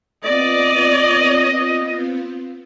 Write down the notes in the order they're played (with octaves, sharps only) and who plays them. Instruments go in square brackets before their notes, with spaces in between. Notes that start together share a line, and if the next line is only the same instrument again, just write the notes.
[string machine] B3 C4 F4 [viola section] D5 [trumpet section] D#5